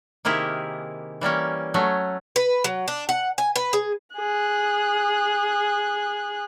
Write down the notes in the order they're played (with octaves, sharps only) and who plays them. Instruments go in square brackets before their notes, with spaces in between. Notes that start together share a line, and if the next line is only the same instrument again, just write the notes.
[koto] C3 D#3 A#3 E4 G4 G#4
E3 G3 A#3 C#4
F#3 A3 C#4
[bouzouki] B4
F#3
D4
F#5
G#5
B4
G#4
[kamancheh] G#4 F#6